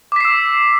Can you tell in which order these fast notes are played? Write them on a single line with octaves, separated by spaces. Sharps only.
D6 B6 C7 E6